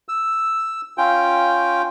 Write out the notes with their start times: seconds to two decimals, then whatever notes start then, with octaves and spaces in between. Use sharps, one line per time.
0.08 E6
0.98 C#4 F4 G5